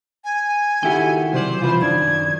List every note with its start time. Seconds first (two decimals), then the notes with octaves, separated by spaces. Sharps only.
0.24 G#5
0.83 D#3 E4 F#4 G4 A4 G5
1.33 C2 F#3 C5 D5
1.62 C3 E3 F3 F4 B4
1.81 F#2 D#3 D4 G#6